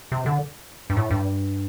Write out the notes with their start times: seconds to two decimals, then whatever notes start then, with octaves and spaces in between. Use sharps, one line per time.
0.12 C3
0.26 D3
0.90 G2
0.97 A2
1.11 G2